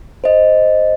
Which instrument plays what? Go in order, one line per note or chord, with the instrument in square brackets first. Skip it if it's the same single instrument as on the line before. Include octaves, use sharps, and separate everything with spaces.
[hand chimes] C5 D#5